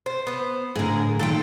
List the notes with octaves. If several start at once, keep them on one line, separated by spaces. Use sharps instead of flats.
C5
B3 C5
A2 D3 G#4 A#4
A#2 D#3 F4 A4 G5